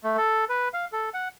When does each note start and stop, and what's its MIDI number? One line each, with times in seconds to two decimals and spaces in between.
0.04 0.17 57
0.17 0.45 69
0.49 0.69 71
0.74 0.85 77
0.92 1.10 69
1.14 1.28 78